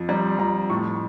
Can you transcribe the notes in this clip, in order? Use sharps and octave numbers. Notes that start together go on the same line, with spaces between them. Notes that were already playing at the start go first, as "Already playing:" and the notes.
Already playing: F2
G3 A#5
F2 A#5
A2 C#6